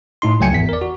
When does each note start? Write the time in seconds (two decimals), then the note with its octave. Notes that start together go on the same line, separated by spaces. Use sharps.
0.22 A2 D#4 C6
0.40 C#2 F#3 A3 G5 G#5 C#7
0.51 G#1 E2 B6
0.69 A#4 D5
0.81 F#4